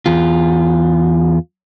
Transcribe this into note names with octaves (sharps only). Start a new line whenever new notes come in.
E2 F4